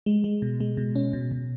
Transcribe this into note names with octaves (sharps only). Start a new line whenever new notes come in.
G#3
G#3
B2
G#3
B2
C#4
B2
B2